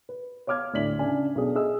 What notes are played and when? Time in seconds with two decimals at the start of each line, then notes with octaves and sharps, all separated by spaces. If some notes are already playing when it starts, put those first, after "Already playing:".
0.09 B4
0.47 C#5 F5 D6 F6 G#6
0.73 D2 A2 D5 B6 F#7
0.99 C#3 D4 G#5
1.35 B1 D4 G#4
1.55 G#4 D#5 E5 G#5 E6